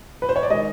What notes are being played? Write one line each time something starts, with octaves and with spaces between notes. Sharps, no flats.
B4
C5
C#5
D5
D#3 G#3 D#5